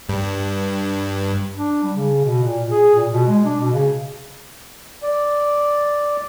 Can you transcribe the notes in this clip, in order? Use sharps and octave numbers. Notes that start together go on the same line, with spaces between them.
G2
D4
G3
C#3
B2
A#2
G#4
A#2
B2
G#3
D4
B2
C#3
D5